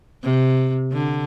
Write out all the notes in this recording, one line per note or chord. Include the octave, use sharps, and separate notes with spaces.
C3
D3